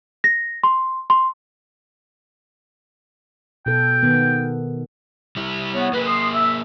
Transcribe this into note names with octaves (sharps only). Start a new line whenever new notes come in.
A#6
C6
C6
B2 A4 G5
D#3 B3
G3 E4
B3 C#5
A#3 G#4 B4
C6 D#6
E5 E6